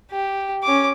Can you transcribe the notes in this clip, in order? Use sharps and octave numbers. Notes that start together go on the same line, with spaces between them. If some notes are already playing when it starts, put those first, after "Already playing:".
G4
C#4 D6